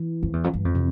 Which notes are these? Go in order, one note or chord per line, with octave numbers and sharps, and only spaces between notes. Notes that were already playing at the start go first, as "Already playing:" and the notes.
Already playing: E3
F2
E2
F2
G2
F2
C3